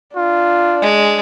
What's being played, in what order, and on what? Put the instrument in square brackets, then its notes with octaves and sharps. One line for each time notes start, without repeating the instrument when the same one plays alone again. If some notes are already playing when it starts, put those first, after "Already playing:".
[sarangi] D4 [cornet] F4
[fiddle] G#3